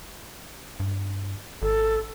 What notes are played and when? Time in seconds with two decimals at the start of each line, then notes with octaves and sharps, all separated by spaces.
0.80 G2
1.62 G#1 A4